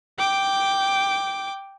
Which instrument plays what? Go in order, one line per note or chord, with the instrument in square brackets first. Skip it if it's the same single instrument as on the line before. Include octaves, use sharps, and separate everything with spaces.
[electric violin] G5 D6